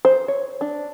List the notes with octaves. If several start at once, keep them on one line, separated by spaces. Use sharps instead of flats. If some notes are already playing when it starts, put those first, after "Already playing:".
C5
C#5
D4